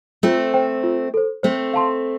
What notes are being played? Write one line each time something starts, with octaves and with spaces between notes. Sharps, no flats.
A3 C4 F4
C5 G5
F4
A4 C5
A3 C4 C5
F5 A5 C6